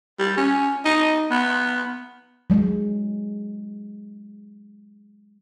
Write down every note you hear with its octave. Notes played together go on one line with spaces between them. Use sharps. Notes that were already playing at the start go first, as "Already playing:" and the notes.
G3
C#4
D#4
B3
F#3 G#3